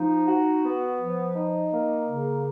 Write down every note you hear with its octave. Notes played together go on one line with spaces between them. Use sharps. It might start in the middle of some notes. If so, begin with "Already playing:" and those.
Already playing: F3 D#4
F#4
B3
F3
D#4
A#3
C#3